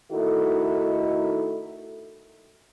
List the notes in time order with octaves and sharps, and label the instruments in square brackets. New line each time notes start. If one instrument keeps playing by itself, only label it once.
[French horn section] D#3 A3 D#4 E4 F#4 A4